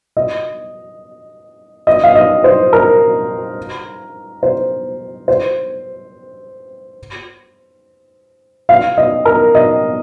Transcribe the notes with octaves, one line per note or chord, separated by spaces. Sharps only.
D#5
D#5
F5
D#5
C5
A#4
C5
C5
F5
D#5
A#4
D#5